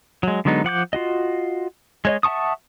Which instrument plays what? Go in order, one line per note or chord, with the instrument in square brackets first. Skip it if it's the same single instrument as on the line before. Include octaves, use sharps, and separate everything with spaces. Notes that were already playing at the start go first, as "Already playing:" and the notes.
[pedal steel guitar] F#3 G#3
D3 F#3 G#3 B3 D#4
F3 F#5 D6 G6
F4 F#4 D#5
G#3 C#5 D#5
E5 F#5 A5 C#6 D#6